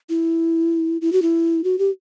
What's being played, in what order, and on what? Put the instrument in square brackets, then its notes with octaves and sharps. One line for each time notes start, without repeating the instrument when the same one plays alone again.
[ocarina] E4
E4
F#4
E4
F#4
G4